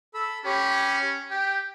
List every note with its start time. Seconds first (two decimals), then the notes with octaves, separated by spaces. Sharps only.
0.14 A4 B5 E6
0.45 C#4 G4 C#5 B5
1.31 G4 G5